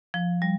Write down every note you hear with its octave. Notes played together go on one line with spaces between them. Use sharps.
F3
G3